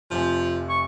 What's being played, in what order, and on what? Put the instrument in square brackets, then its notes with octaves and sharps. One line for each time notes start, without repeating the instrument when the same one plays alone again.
[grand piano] F1 C3 G#5 [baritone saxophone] F3
[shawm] C#6